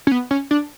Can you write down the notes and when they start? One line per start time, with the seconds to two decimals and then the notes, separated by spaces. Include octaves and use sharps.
0.07 C#4
0.12 B3
0.31 C#4
0.51 D4